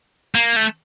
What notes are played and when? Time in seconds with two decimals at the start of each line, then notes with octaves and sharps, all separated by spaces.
0.35 A#3
0.56 A3